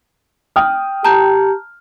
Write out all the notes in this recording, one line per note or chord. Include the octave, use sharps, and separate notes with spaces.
G5 D#6 F6
G4 A5 A#5 G6